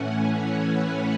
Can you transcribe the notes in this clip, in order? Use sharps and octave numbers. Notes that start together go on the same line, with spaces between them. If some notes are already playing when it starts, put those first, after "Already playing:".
Already playing: A2 E3 A3 C#4 F#5 G#5
C#5
B4